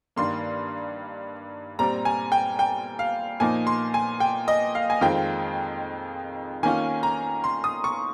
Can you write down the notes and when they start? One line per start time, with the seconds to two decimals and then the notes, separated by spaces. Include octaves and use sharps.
0.16 G2 D#3 A#3 C6
1.79 A#2 G3 C4 A#5
2.05 G#5
2.32 G5
2.59 G5
2.99 F5
3.40 A#2 F3 A#3 D#4 G#5
3.67 C6
3.94 G#5
4.20 G5
4.48 D#5
4.75 F5
4.90 G#5
5.01 F2 D#3 G#3 C4 F4 G5
6.63 D#3 A#3 C#4 F4 G#5
7.03 A#5
7.44 C6
7.64 D#6
7.84 C#6